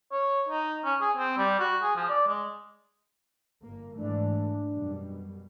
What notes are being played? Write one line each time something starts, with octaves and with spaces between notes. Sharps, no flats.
C#5
D#4
C#4
G#4
C4
G3
F#4
G#4
F3
D5
G#3
G1 A#3
G#2 E3 A3 D4
F#2 B2 G3